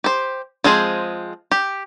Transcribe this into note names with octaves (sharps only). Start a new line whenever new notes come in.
G4 C5
F3 G#3 C4 G#4
G4